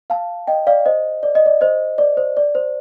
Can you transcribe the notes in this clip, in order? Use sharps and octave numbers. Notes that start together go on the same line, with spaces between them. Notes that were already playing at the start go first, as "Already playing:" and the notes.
F5 A5
D#5 G5
D5 F5
C5 D#5
D5
D#5
D5
C5 D#5
D5
C5
D5
C5